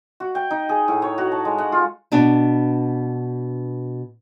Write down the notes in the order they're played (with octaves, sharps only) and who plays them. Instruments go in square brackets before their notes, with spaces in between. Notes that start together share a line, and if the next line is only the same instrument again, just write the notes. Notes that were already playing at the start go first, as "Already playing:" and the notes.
[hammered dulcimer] F#4
G5
D#4
G#4
A2
C#5
F#4
A5
G#3
F#5
F4
[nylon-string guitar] B2 B3 D4